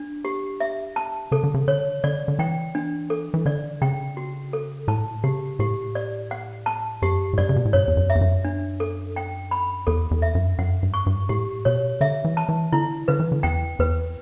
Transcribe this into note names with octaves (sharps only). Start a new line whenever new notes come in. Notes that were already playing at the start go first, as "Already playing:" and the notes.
Already playing: D4
G4
E5
A5
C#3 A4
D3
C#3
D3 C#5
D3 D5
D3
E3 G5
D4
A4
E3
D3 D5
C#3 G5
F#4
A4
A2 A5
C#3 G4
A2 G4
D5
F#5
A5
F#2 G4
A2
G2 D5
C#3
B2
A2
G2 C#5
E2
F#2
E5
E2
F#2
D4
A4
G5
B5
E2 A4
E2
E5
F#2
F#2 F#5
G2
C#6
G2
A2 G4
B2 C#5
D3 E5
E3
A5
E3
D3 E4
D3 B4
E3
D3
E2 G5
E2 B4